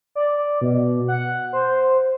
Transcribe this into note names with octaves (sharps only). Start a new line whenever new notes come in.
D5
B2
F#5
C5